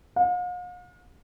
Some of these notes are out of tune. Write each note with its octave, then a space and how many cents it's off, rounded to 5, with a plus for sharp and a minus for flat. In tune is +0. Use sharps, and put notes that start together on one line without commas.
F5 +45